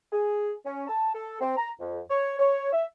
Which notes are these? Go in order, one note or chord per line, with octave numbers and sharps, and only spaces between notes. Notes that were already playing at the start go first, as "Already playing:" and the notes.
G#4
C#4
A5
A4
C4
A#5
F2
C#5
C#5
E5